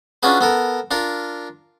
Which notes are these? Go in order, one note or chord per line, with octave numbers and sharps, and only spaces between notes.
C#4 D4 F4 F#4 G#4 B4
B3 A4 A#4
D4 F4 A#4